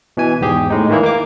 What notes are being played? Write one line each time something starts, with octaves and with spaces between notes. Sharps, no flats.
B2 E3 G#5
E2 G#2 G4 G#4
A2 G#3 D#4
D#3 E3 A#3 E4
A#3 D6